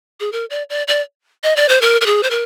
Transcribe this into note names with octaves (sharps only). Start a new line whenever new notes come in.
G#4
A#4
D5
D5
D5
D#5
D5
C5
A#4
A#4
G#4
C5
A#4